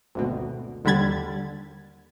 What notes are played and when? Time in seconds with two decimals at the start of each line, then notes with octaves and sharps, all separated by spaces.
0.15 G#1 D2 B2
0.85 D#2 D3 G3 B5 G#6 A6